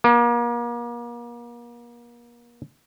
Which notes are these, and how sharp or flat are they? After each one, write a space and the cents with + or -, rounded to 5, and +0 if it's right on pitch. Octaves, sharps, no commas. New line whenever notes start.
A#3 +35